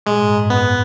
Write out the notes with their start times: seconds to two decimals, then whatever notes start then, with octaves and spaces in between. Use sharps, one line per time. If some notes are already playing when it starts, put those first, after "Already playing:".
0.06 A#2 G#3
0.17 G#2
0.27 F#2
0.39 G#2
0.50 B3